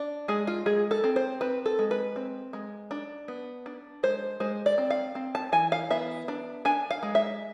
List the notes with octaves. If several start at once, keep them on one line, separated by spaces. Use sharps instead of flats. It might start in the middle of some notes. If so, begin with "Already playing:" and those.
Already playing: D4
G#3 G#4
F4
G#3 G#4
A4
C4
C5
C4 B4
A4
G#3
B4
C4
G#3
D4
B3
D4
G#3 C5
G#3 C5
D5
C4
F5
C4
A5
E3 G#5
F5
B3 E5
D4
D4 G#5
F5
G#3
E5